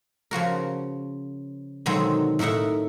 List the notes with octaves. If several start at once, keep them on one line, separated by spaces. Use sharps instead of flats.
C#3 F3 F#4 A#4
B2 D3 D#3 F#3 G#3 C4
A2 D#4 A#4 E5 F#5